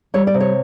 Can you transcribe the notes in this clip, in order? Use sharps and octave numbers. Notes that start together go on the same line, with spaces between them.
G3 C#5
D5
C3
C#5